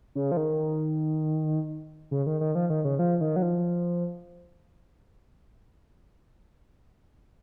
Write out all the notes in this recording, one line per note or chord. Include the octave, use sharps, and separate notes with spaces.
C#3
F3
D#3
C#3
D#3
D#3
F3
D#3
C#3
F3
D#3
F#3
F3